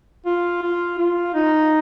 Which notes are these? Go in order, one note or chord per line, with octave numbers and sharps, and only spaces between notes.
F4
F4
F4
D#4